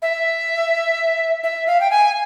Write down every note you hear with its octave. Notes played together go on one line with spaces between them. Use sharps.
E5
E5
F5
G5
G#5